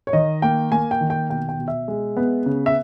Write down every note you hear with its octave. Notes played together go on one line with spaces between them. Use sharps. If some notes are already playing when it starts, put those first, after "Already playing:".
C#5
D#3 D#5
A#3 G5
A#3 G#5
G5
D#3
G5
B2 G5
G5
B2
E5
G#3
B3
C#3
E5